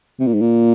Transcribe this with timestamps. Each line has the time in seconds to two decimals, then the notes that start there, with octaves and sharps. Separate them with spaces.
0.20 C3
0.27 A#2
0.34 G#2
0.41 A#2